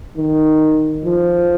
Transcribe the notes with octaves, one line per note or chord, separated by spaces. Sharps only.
D#3
F3